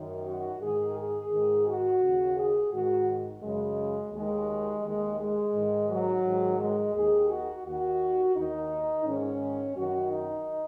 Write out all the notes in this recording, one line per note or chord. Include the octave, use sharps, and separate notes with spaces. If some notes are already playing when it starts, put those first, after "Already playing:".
Already playing: F#2 D#3
F#4
G#2 D#3 G#4
G#4
G#2 D#3
F#4
D#2 C#3
G#4
G#2 D#3 F#4
F#2 C#3 G#3
D#2 D#3 G#3
D#2 D#3 G#3
G#3
G#2 D#3
F#3
G#2 D#3
G#3
D#2 D#3 G#4
F#4
D#2 D#3 F#4
D#2 D#3 D#4
G#2 D#3 C#4
F#2 D#3 F#4
D#4